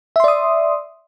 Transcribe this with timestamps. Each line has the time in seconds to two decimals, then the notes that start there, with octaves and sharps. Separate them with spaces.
0.16 E5
0.20 C6
0.24 D5
0.28 D#6